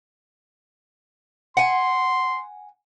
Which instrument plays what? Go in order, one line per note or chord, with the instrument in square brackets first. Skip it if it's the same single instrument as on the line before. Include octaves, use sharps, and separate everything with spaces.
[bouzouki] F#5 G#5 [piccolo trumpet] C6